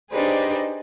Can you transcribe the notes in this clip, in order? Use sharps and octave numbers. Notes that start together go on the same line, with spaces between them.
D4 D#4 G4 G#4 B4 C5